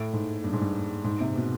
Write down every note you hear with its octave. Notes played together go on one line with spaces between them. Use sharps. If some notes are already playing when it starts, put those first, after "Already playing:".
Already playing: A2
G#2
G2
G#2
G2
G#2
C3
B2